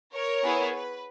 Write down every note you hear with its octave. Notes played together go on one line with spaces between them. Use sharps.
A#4 C#5
B3 E4 G#4
B4